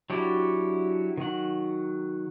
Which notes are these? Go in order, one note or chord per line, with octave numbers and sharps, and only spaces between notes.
F#3 D4 E4 F#4 G4
D#3 F#3 F#5